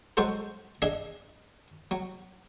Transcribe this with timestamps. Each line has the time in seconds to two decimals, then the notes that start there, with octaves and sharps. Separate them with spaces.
0.17 F#3 G#3 F#4 A4 C5
0.82 D4 G#4 D#5 E5
1.91 F#3